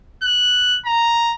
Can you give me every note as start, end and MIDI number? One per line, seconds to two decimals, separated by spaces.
0.23 0.79 90
0.85 1.35 82